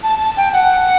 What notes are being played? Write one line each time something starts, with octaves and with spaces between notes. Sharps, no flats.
A5
A5
G5
F#5